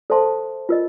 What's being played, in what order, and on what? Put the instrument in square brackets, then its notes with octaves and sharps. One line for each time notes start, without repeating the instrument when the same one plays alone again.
[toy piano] A4 C5 E5 A5 C6
F4 A#4 D#5